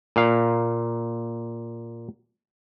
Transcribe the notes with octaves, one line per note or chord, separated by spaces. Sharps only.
A#2 F5